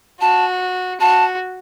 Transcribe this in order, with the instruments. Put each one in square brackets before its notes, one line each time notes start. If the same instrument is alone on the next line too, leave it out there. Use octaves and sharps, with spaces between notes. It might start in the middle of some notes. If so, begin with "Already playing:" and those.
[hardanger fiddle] F#4 [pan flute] A5
[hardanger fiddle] F#4 [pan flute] A5